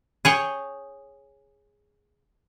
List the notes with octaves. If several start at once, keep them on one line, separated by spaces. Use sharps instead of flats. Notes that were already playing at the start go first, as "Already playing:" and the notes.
G#4 C#5 G5